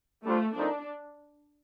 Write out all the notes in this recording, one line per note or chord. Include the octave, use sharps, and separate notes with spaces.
G3 A3 D4 F4 C5
F3 A3 C4 D4 D#4 A#4